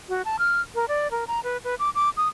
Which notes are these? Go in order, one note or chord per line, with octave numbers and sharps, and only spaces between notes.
F#4
A5
F6
A#4
D5
A#4
A#5
B4
B4
D6
D6
D#6